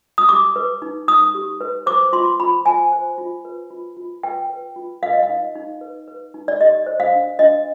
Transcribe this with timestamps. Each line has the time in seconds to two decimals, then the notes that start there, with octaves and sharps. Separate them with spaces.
0.18 D#6
0.29 G4 D6
0.56 B4
0.82 D#4
1.08 D#4 D#6
1.35 G4
1.61 B4
1.86 C5 D6
2.13 F4 C6
2.40 F4 B5
2.66 C5 G#5
2.92 C5
3.18 F4
3.45 B4
3.70 F4
3.97 F4
4.23 B4 G5
4.50 B4
4.76 F4
5.03 B4 F5
5.13 D#5
5.23 F5
5.29 D#4
5.55 D#4
5.81 B4
6.08 B4
6.34 D#4
6.48 D5
6.60 G4 D#5
6.86 C5
7.00 F5
7.13 D4
7.39 D4 D#5